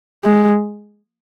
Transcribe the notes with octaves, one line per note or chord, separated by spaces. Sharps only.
G#3